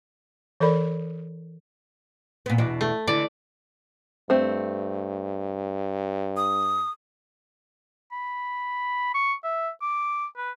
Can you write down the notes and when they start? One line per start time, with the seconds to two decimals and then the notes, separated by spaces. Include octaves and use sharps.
0.60 E3 A4 A#4 D5 B5
2.46 A#2 B3
2.58 E2 B2 D4
2.81 A3
3.07 D3 E3 D5
4.30 G2 A3 C4
6.37 D#6
8.12 B5
9.14 C#6
9.43 E5
9.81 D6
10.37 B4